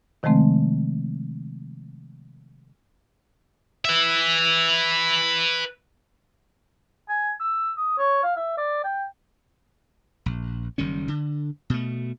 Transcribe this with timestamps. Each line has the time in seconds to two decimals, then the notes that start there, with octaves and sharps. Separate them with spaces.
0.23 C3 D#3 F3 G#3 A3 C4
3.85 B4 E5
7.09 G#5
7.40 E6
7.77 D#6
7.98 C#5
8.23 F5
8.36 E5
8.57 D5
8.84 G5
10.26 A#1
10.78 F#1 D#3 G3 C#4
11.08 D3
11.70 B2 A3